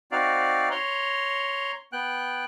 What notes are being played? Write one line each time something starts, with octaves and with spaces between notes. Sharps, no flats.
C4 D#4 F#4 D5 F5
C#5 A#5 C6
B3 G5 F#6